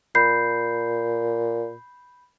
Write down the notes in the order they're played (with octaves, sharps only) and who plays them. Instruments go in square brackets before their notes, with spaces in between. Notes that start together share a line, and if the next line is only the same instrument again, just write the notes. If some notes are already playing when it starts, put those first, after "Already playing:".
[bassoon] A#2 [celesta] B5 G6 C7